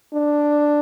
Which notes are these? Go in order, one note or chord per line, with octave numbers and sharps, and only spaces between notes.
D4